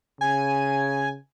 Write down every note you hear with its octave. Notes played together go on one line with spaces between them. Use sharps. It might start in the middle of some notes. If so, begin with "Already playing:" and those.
C#3 G#5